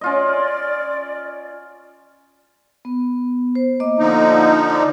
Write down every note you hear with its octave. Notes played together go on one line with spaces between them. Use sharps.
C#4 F4 D5 D#5
B3
C5
A#3 D#5 D6
D3 F3 D#4
D5 D6